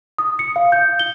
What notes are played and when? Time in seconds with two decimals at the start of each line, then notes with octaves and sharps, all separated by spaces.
0.18 D#6
0.39 C#7
0.56 F5
0.72 G6
0.99 G7